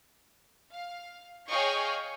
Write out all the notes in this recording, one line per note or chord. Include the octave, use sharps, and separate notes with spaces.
F5
G#4 C#5 D#5 F5 G5 C#6